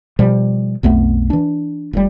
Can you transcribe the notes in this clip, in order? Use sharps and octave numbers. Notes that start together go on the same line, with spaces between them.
B2 F3 G3
B1 F2 A3 B3
E3 D4
F1 F2 G3